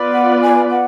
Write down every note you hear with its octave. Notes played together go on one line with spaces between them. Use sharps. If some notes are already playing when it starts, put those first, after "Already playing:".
Already playing: B3 F4 B4 D5
F#5
G#5
F#5